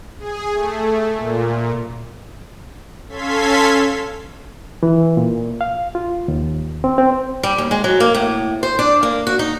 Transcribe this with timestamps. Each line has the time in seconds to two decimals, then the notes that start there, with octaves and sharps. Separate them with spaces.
0.19 G#4
0.54 A3
1.17 A#2
3.09 C#4 A4 F5 C6 G#6 B6
4.83 E3
5.17 A#2
5.61 F5
5.95 F4
6.28 D#2
6.84 C4
6.98 C4
7.43 G3
7.58 D#2
7.71 G#3
7.84 F#3
8.00 A#3
8.15 A2
8.63 C5
8.79 D4
9.03 A#3
9.27 F#4
9.39 D#4